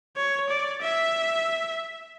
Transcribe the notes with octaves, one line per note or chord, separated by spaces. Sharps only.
C#5
D5
E5